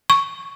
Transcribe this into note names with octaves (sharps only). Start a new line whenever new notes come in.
C#6